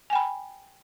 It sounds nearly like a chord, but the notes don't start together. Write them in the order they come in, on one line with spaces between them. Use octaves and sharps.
G#5 G5 B5